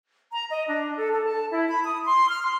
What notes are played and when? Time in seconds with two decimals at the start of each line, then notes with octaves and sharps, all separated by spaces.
0.32 A#5
0.49 D#5
0.67 D4
0.96 A4
1.12 A4
1.25 A5
1.51 E4
1.67 B5
1.83 D#6
2.05 C6
2.28 F6
2.42 C6